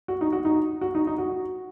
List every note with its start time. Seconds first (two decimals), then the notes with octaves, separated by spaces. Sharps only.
0.08 F#4
0.21 D#4
0.33 F#4
0.45 D#4
0.81 F#4
0.95 D#4
1.07 D#4
1.18 F#4